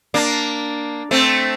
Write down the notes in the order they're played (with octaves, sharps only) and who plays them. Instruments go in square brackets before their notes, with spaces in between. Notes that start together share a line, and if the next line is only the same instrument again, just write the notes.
[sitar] A#3 D4
A3 C4